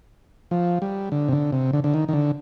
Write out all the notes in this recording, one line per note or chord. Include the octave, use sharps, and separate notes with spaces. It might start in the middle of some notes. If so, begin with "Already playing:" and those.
F3
G3
D3
C3
D3
C3
D3
D3
D#3
D#3
D3